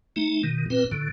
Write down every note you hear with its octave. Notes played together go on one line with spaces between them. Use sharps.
A3 D#4
B2 D#3
A#2 C4 B4
A2 D3